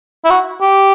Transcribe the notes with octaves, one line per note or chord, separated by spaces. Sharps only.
E4
F#4
G4